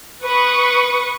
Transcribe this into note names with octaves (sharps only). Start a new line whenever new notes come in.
B4 C#6 D#6